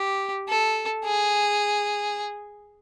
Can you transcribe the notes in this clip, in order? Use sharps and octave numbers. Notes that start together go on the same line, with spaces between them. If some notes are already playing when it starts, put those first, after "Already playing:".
Already playing: G4
A4
G#4